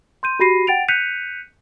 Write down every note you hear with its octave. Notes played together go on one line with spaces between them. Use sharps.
C6 G6 D#7
F#4 G4 B5 A#6 C7 D#7
F#5 G5 A6 D7 F7
F#6 G6 B6 C#7 D#7 F7